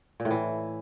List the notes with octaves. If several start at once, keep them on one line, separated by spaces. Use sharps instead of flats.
A#2
A2
E3